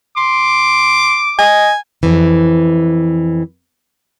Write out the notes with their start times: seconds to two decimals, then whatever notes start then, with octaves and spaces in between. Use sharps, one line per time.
0.17 C6 D6
1.39 D#5 G#5
2.03 F2 E3